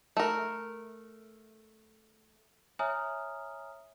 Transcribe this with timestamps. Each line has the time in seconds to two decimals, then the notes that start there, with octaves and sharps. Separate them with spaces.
0.17 A3 A#4
2.79 C#5 E5 G#5 A#5 D#6 F6